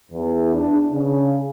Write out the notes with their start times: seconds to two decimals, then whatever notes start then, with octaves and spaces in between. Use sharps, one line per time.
0.12 E2
0.54 D4
0.92 C#3